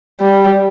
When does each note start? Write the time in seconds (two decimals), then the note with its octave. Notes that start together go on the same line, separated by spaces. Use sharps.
0.20 G3